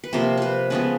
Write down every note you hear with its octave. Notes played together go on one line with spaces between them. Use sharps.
B4
C3 F3 A#3 C5
B4 C5
C#3 F3 G#3 B3 B4